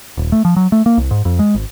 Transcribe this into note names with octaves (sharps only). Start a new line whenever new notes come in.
D#1
A3
F3
F#3
A3
A#3
C2
G#2
F2
G#3
G#1